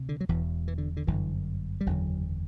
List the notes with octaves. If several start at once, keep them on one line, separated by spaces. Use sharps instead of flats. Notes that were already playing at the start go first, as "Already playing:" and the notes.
Already playing: D2 C3
D3
F#3
E1 E2 B2 E3
E3
D3
D3
G1 F#2 D3 E3
G3
F#1 E2 D3 F#3